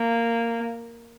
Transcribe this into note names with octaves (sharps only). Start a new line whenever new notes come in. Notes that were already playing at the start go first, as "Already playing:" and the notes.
Already playing: A#3